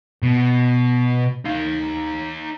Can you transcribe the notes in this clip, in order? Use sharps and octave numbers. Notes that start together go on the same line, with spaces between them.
B2
D#4 F5